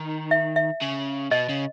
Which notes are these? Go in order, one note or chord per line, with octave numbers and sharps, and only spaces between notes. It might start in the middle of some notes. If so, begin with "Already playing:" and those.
Already playing: D#3
E5
E5
C#3
B2 D#5
C#3